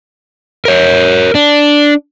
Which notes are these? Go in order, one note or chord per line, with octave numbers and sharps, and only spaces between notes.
A#4 C#5
D4